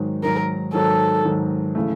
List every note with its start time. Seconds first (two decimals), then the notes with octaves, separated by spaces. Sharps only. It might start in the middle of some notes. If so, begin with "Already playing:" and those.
Already playing: G#2 D#3 F#3
0.23 G#2 D#3 F#3 A#4
0.74 G#2 D#3 F#3 A4
1.25 G#2 D#3 F#3
1.75 C#3 E3 A3